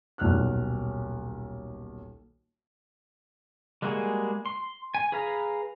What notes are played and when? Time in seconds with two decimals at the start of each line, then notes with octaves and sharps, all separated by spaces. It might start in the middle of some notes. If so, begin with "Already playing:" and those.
0.18 D#1 B1 F6 F#6
3.82 G3 G#3 A#3 F#4 G#4
4.46 C6
4.95 G#5
5.12 G#4 B4 F5 A#5